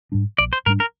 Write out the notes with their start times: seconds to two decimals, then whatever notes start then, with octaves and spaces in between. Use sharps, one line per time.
0.12 G#2 G3 D4
0.38 A#1 D5
0.53 C5
0.66 G#2 G3 D4 A#4
0.80 A#4